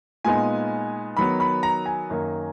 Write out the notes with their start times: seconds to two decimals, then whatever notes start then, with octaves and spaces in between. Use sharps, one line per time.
0.25 A#2 G#3 B3 D#4 G#5
1.17 D#3 F#3 B3 B5
1.40 B5
1.63 A#5
1.86 G#5
2.10 F#2 D#3 A#3